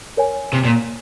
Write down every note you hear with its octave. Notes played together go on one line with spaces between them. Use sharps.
A#4 C#5 G#5
C3
A#2